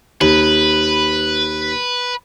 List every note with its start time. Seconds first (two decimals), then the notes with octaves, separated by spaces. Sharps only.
0.21 D#2 B4